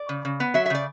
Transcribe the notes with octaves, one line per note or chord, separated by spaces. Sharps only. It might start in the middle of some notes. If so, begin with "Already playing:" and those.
Already playing: D5
C#3
C#3
B3
F#3 E5
E5
C#3 D5